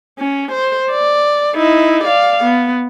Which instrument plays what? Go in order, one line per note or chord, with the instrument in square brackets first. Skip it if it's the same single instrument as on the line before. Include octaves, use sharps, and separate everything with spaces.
[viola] C#4
C5
D5
D#4 E4
D5 F5
B3